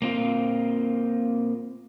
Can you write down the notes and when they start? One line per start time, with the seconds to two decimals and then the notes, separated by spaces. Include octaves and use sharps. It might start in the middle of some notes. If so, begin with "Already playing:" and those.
0.02 A#3 C4 F4